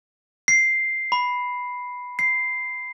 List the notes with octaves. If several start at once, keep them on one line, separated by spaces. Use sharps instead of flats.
C7
B5
C7